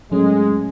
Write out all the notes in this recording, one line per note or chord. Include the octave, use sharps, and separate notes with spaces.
A2 F#3 G#3 A3 C#4